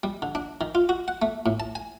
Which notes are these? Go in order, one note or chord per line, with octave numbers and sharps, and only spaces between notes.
G3
D3
D4
D#3
F4
F#4
F#5
A3
A2
A5
G#5